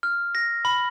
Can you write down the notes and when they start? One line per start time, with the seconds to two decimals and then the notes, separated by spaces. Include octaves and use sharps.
0.03 F6
0.35 A#6
0.65 B5